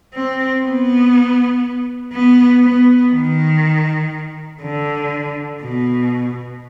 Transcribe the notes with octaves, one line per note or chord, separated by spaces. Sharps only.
C4
B3
B3
B3
D#3
D3
B2